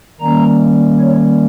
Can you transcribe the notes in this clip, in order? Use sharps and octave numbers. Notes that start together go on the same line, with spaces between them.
D#3 G3 A#3 C#4 A#5
C#5